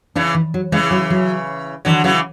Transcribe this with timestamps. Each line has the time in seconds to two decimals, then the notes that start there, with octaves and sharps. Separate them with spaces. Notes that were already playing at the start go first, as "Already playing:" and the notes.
0.15 C#3 E3 D4
0.34 E3
0.54 F#3
0.72 C#3 E3 G#3
0.91 F#3
1.10 F#3
1.85 D3 E3 F#3
2.04 C#3 E3 F#3